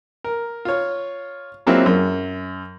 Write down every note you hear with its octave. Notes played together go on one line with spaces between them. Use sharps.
A#4
F4 C#5
F#3 G#3 A#3 C4 E4 F4
F#2